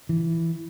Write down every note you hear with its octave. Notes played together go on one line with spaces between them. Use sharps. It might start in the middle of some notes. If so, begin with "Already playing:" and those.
E3